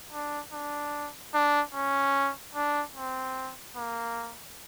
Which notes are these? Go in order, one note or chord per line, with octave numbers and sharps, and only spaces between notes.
D4
D4
D4
C#4
D4
C4
A#3